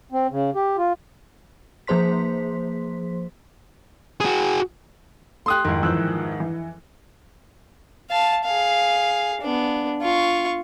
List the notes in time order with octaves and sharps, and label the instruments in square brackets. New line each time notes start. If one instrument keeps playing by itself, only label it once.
[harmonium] C4
C#3
G4
F4
[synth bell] F3 A#3 G#4 C5 C6 B6
[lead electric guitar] F#4 G#4
[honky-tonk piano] A3 G4 [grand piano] C6 D#6 F#6
[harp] F2 G#3 E4 [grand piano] G#2 D#3
[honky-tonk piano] E3 F3 [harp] E6 F#6 G6
[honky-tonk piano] E3
[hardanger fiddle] F5 A5
G#4 F5
B3 D4
F4 C#6